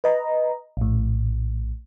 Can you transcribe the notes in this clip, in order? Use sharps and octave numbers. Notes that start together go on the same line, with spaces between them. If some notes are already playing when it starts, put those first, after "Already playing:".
B4 D#5 A#5
A#1 A2